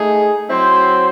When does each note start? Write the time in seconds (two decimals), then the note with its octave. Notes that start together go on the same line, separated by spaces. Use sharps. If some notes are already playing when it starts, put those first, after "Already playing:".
Already playing: A3 D#4 G#4
0.49 F#3 C4 E4 C5